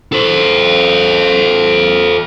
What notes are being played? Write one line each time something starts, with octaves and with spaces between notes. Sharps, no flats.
A4 C5